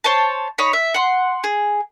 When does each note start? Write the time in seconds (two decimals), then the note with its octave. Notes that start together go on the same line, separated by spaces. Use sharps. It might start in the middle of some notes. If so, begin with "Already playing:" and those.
0.04 C5 C#5 A5
0.58 D#4 C#5 B5
0.73 E5
0.94 F#5 C6
1.44 G#4